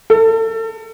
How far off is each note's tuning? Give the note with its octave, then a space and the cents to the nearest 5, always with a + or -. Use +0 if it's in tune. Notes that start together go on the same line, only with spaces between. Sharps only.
A4 +35